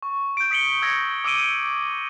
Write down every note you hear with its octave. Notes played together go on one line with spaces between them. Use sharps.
C#6
G6 D7
D#6 B6 C#7 F#7 G7
E6 G#6 A#6 C#7
D6 E6 D7 D#7 G7